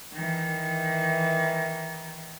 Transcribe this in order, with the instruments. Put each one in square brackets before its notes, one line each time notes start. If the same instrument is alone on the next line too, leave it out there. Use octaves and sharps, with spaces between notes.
[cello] D#3 E3